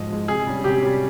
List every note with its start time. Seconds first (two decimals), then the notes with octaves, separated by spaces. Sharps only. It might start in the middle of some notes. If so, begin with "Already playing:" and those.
Already playing: G#2 F3 G#3 D#5
0.10 F3 G#3
0.28 C3 G#4
0.47 G3 C#4
0.64 C3 G4
0.83 G3 C#4